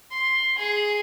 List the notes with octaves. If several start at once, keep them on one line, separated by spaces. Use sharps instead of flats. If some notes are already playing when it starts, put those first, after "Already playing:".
C6
G#4